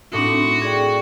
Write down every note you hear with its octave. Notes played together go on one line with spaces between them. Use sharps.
A2 C4 D4 D#4 F#4
G#4 D5 G5